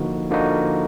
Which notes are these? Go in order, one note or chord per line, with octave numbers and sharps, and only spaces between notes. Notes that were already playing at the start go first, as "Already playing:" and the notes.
Already playing: D3 F3 A#3 D#4 F#4
D3 F3 A#3 D#4 F#4